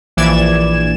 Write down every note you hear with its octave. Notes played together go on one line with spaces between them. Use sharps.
A#1 E3 D5 G#6 E7